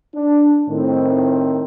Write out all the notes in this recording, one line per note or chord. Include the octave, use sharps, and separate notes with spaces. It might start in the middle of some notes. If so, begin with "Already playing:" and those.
D4
A2 D#3 C4